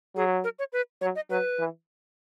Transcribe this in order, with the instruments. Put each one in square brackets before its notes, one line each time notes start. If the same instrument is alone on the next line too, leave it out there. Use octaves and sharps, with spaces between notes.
[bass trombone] F#3 [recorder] G#4
[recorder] A#4
C#5
B4
[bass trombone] F#3 [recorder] C#5
[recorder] D#5
[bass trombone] F#3 [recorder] B4
[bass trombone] E3